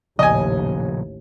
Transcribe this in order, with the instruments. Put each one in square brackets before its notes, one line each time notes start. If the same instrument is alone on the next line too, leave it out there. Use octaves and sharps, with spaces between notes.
[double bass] A1 D#2 [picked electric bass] A#2 C#3 F3 [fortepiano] D#5 G#5